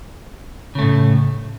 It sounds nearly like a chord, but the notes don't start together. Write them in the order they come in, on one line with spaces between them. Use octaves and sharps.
C#3 A3 A2